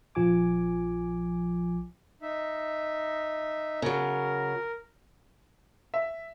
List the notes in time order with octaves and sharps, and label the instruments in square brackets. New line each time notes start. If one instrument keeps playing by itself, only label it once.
[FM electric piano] A#1 F3 G#5 D6
[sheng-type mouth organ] D#4 E5
[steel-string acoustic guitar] C#3 F#3 [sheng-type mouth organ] A#4
[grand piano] E5